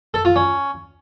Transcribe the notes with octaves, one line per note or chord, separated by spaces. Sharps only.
A4
F4
C#4